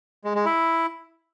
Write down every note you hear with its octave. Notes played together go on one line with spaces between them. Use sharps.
G#3
G#3
E4